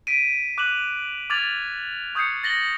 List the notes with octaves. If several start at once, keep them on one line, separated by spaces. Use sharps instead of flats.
B6 D7 D#7
D6 F#6 D#7 E7 F#7
D6 F6 G#6 A6 F7 F#7
C#6 D#6 G6 G#6 C7 C#7
A6 A#6 F#7 G7